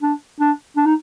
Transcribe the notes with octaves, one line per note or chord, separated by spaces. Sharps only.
D4
D4
D4
D#4